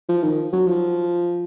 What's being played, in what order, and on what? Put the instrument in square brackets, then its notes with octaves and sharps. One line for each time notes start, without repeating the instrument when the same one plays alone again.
[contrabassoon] F3
D#3
F#3
F3